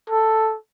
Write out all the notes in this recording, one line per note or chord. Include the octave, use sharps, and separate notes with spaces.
A4